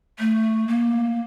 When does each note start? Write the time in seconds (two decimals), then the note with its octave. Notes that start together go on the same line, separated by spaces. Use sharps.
0.19 A3
0.68 A#3